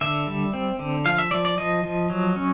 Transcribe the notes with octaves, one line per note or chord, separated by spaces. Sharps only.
D3 E5
G3
C4
D3
F3 F5
E5
F3 D5
D5
F3 D#5
F3
F#3
C#4